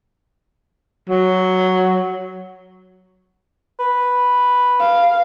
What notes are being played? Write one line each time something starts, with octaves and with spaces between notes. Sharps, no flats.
F#3
B4
F5